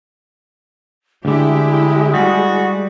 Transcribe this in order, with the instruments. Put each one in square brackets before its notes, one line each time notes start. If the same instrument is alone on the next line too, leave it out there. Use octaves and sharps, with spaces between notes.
[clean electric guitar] D2 D3 [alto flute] G#3 [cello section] E4 G4
[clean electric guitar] G3 [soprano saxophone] F#4